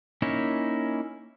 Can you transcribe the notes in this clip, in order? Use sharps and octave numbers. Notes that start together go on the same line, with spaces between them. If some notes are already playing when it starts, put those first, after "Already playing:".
A#3 C#4 D#4 E4 C#5